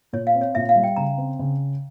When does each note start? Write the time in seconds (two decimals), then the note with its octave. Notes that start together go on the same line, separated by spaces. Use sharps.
0.13 A#2 C#5
0.27 F5
0.35 C4
0.41 C#5
0.55 A#2 E5
0.69 F5
0.76 G3
0.83 G5
0.96 C#3 A#5
1.18 C4
1.39 C#3